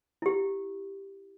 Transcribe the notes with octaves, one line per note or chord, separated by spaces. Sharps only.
E4 G4